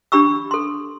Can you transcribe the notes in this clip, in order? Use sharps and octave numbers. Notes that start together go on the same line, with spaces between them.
D4 G4 B5 C#6 E6
A4 C6